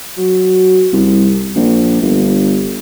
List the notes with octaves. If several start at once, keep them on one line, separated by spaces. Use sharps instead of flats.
F#3
C2
A#1
G1